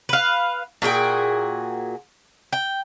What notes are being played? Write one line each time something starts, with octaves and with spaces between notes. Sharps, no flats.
B4 F5
A#2 F#4 G#4 G5
G5